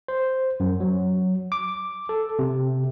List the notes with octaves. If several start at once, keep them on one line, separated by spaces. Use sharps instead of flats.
C5
F#2
F#3
D6
A4
C3